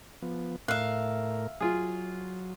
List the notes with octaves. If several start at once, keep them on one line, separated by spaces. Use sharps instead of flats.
F3 B3
A2 A#4 E5 F5 F#6
F#3 F4 G#4